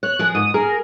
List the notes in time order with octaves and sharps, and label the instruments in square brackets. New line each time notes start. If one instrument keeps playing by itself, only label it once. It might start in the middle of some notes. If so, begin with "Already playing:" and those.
[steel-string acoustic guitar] C#5 [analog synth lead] F#6
[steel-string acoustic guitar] F3 G#4 A#4
[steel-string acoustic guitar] G#2 [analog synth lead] D#6
[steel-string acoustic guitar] G#4 [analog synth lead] A#4